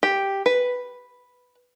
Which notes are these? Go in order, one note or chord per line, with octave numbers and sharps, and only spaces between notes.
G4
B4